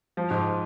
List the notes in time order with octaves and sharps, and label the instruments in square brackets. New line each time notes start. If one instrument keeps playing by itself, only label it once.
[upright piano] F3
G#2